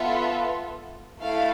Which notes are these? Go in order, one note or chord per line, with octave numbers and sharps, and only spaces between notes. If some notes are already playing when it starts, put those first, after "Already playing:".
Already playing: B3 F4 A4 E5
A3 E4 A4 F5